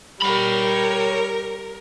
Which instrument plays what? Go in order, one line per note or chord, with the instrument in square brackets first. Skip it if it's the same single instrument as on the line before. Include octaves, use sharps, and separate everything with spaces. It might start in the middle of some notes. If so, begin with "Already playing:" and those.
[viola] G3 [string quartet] A#4 [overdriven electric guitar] C#5 B5